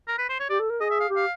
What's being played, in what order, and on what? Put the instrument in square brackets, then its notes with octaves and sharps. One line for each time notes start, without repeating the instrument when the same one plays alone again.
[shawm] A#4
B4
C5
C#5
[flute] G4 [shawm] D5
[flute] A4
A#4
[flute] G#4 [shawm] D#5
[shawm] E5
F5
[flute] G4
[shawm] F5